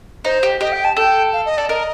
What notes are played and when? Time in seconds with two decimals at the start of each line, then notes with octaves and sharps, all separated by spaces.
0.25 D#4 C5
0.43 G4
0.61 G4 D#5
0.73 G5
0.84 A5
0.97 A4 G5
1.33 F5
1.46 D#5
1.57 A4 D5
1.69 A#4 D#5